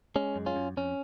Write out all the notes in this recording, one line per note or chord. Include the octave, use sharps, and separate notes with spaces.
G#3 C#4
F#2
C#4 F4
F#2
F2 C#4